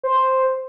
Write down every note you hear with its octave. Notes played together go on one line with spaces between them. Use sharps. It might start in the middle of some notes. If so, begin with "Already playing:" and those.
C5